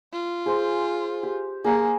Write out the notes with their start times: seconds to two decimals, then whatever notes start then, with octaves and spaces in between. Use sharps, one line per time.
0.13 F4
0.46 G#4 C5
1.23 G4
1.64 A#3 G#4 A#4 G#5